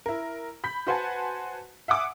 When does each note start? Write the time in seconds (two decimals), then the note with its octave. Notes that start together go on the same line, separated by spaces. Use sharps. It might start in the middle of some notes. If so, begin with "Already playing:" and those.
0.06 E4 A#4
0.64 B5 G6 B6
0.87 F#4 B4 C5 F#5 G#5 A5
1.88 E5 F#5 G#5 D6 D#6